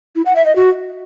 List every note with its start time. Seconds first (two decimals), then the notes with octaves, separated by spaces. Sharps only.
0.16 E4
0.26 F#5
0.36 E5
0.46 D#5
0.56 F#4